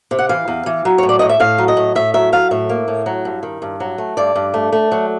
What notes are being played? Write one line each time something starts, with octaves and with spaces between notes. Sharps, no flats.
C3
F#5
E3 F5
E2
E3
F#3
A2 C#5
D5
A2 D#5
E5
A2 F5
F#3
D#5
A2
A2 E5
F#3 E5
F#3 F5
A2 E5
A#3
A2
F#3
G2
D#3
G2
F#3
A3
G2 D5
G2
A3
A3
F#3